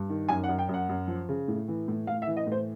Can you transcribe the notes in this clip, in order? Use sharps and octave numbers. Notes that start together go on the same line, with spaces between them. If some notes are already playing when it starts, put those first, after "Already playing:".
Already playing: G2
D#3
F#2 G#5
F#5
F#2
G5
F#2
F#5
F#2
F3
C#3
A2
E3
A2
A2 F5
E5
E3
D#5
A2
C5